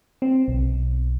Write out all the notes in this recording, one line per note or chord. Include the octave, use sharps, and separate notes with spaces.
C4
B1